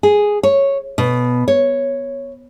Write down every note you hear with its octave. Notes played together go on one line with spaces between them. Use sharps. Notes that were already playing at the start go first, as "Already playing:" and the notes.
G#4
C#5
B2
C#5